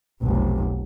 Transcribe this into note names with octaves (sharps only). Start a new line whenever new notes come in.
F1 B1